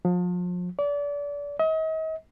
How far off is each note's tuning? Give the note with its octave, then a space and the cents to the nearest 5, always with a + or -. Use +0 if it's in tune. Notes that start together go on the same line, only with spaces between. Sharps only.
F3 +35
D5 -30
D#5 +40